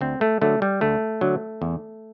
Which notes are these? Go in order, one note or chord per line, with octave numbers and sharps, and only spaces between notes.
D2 C4
A3
D3 F#3 A3
G3
D2 A3
D3 F#3
E2